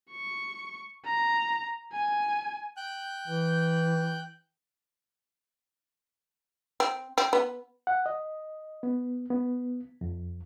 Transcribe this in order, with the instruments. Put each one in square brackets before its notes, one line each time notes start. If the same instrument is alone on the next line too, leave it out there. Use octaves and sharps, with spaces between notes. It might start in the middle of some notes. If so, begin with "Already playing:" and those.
[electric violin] C#6
A#5
G#5
[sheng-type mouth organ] G5 F#6 G6
[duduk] E3
[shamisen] C4
C4
B3
[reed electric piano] F#5
D#5
B3
B3
F2